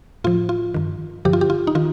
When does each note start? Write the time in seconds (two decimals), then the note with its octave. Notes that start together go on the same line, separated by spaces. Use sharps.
0.24 A2 F3 F4
0.49 F4
0.74 G2 D#3
1.25 G2 D3 F3 G4
1.33 F4
1.41 G4
1.50 F4
1.67 D#4
1.75 D#3 F4